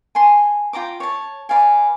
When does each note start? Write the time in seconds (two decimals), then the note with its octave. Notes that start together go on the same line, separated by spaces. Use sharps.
0.15 G#5 A5 C6
0.73 F4 G5 A#5 D6
1.00 C#5 A5
1.49 B4 D5 F5 G#5